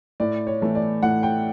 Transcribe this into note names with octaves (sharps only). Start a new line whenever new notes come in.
A2 D5
C#5
E3 A3
D5
A2 F#5
G5